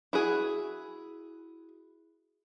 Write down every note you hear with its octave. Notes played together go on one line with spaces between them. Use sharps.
E4 F#4 G#4